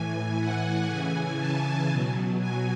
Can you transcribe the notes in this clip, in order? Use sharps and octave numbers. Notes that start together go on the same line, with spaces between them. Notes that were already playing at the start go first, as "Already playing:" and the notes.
Already playing: A2 E3 G#5
F#5
C#3 E3 G#5
A5
B2 F#3
G#5